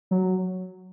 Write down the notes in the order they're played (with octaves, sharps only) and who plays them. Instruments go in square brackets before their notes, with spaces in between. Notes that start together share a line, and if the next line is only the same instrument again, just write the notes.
[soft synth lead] F#3